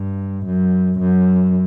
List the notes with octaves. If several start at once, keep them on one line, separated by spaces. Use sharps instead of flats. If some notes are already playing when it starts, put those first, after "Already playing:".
Already playing: G2
F#2
F#2